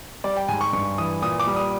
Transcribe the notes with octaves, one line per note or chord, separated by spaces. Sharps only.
G3 D5
G5
G#2 G#5
C#6
G2 C#6
E3 D#6
A#2 D#6
D6
G3
D#6